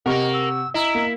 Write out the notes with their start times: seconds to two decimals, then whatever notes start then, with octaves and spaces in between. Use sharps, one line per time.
0.06 C3 A#3 A#4 D#5 F#5 C#6
0.33 E6
0.74 E4 D#5 A#5 E6
0.95 A#3